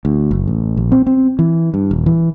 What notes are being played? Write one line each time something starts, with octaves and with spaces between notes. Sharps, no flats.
D2
F#1
A1
A#1
C4
C4
E3
G2
D#1
E3